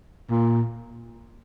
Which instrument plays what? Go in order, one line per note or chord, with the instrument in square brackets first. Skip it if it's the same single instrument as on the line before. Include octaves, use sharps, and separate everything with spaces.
[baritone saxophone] A#2